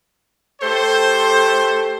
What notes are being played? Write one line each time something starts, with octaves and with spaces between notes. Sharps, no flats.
A3 G4 A4 C5